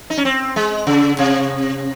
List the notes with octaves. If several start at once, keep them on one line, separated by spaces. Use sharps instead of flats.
D#4
C#4
C4
G#3
C#3
C3